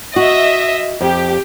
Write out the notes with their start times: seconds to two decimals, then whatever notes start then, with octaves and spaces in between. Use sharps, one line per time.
0.16 F#4 D#5 E5
1.01 F2 G4